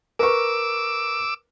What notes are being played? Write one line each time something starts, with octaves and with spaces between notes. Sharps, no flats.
A#4 B4 C#6 D6 E6